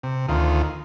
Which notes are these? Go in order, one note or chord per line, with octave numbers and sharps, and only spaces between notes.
C3
D2 D#3 F4